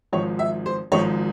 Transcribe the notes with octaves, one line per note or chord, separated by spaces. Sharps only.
G#1 G#2 F3 C#5
E5
C5
G#1 G#2 F3 C#5